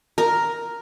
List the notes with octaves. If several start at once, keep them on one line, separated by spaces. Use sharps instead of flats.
A#4